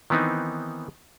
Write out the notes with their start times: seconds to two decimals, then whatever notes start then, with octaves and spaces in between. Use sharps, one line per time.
0.10 D#3 E3 B3 C4 D#4